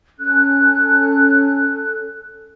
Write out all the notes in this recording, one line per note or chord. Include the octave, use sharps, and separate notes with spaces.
C#4 A4 F#6